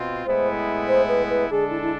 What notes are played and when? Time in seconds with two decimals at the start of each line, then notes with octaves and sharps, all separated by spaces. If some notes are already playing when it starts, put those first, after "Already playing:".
Already playing: B2 C4 F4
0.26 A2 G#3 B3 E4 C5
0.88 C5
1.08 B4
1.30 B4
1.50 D3 G#3 D4 G#4 A4
1.70 E4
1.82 E4